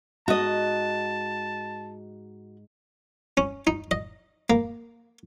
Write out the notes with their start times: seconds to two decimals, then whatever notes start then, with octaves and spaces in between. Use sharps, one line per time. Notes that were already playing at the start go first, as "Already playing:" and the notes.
0.28 G#2 F#4 D#5 A5
3.37 C#4
3.67 D#4
3.91 D#5
4.50 A#3